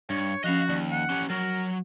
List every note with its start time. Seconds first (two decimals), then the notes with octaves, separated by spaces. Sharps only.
0.10 G2 D4 C#5
0.44 F3 C#4 F#4 D#5 F5
0.69 D#2 D5
0.92 F#5
1.10 C#4 G4
1.30 F#3 A#4